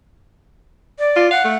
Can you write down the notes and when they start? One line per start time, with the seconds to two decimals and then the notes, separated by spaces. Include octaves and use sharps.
0.99 D5
1.16 F4
1.31 F5 F#5
1.44 A3